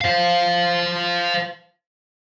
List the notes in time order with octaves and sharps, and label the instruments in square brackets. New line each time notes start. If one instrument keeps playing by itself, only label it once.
[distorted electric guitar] C5 F5